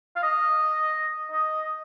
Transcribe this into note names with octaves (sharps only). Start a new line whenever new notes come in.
F5
D#5
D#5